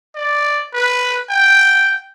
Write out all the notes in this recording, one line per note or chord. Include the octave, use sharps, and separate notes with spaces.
D5
B4
G5